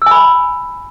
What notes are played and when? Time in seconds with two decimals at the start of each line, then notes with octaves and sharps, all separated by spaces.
0.02 E6
0.06 G#5
0.11 B5